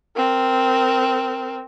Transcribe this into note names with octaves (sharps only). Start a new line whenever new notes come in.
C4 A#4